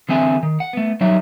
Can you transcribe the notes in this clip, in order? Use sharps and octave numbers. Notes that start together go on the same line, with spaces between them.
D3 E3 C4 E5 G#5
D#3
F#5
A3 B3
F#3 G3 D#4 E5